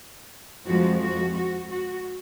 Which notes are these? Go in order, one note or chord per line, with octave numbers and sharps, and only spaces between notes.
F2 F3 G#3 F#4
F#4
F#4
F#4